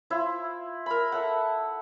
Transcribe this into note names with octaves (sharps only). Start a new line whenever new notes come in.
E4 F4 C5
A#4 B5
A4 E5 F#5